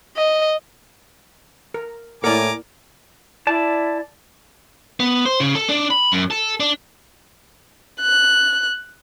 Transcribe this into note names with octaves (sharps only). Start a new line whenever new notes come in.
D#5
A#4
A2 A#3 E4 A#4 D5 G#5 A#5 D6
E4 D5 A5
B3
C5
C#3
A4
D4
B5
F#2
A4
D4
F#6